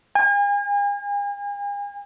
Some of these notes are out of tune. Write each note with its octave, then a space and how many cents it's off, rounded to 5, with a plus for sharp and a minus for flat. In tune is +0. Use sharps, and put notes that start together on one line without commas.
G#5 -40